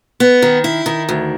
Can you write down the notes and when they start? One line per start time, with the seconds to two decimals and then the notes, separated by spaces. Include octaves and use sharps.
0.20 B3
0.42 D#3
0.64 E4
0.86 D#3
1.09 D2